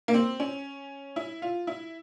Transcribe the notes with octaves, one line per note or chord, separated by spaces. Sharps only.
A#3
C4
C#4
E4
F4
E4